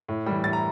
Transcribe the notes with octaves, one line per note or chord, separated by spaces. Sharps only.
A2
E3 G3
A2 A6
A#5